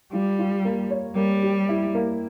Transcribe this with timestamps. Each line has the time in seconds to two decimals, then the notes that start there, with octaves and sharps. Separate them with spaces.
0.13 G3 F4
0.39 F4
0.65 A#3
0.90 C#5
1.16 G3 A#3
1.43 G4
1.69 E4
1.95 A#3